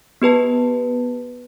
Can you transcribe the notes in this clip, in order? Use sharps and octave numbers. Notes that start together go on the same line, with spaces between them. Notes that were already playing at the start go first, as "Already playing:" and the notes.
B3 G4 B4 A5